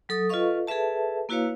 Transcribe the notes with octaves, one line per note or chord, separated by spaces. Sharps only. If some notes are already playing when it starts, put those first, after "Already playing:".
F#3 A4 D#6
F4 A4 B4 D#5 F5 C#6
G#4 A4 B4 E5 A5
A#3 E4 F#4 B4 C#5 F5